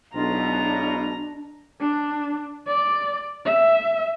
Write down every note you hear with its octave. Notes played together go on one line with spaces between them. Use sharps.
B1 B2 G#3 D4 E4 F4 A#5
D4
D5
E5